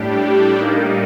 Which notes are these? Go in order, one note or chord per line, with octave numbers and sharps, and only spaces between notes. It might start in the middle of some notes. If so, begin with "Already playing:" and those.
Already playing: A2 G3 D4 G4
A2 G3 A#3 D#4